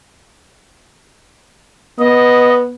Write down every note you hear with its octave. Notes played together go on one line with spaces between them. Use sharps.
B3 D#5